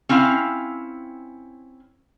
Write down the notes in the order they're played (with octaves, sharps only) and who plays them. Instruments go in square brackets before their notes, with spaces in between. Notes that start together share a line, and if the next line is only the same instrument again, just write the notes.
[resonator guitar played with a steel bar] C4 C#4 E4 F5